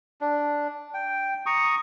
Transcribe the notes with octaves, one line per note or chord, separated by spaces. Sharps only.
D4
G5
A#5 C#6 D#6